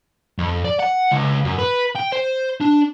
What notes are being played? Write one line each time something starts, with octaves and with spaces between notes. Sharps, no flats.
F2
D5
F#5
C#2
F#2
B4
G5
C5
D4